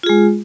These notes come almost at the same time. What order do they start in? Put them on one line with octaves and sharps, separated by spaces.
F4 G#4 G#3